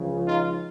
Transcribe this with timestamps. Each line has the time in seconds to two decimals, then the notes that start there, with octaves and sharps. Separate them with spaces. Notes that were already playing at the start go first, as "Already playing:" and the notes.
Already playing: C#2 C#3 F3
0.25 D#4 F4